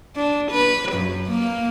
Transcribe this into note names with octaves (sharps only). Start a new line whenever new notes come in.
D4
B4
F#2
A#3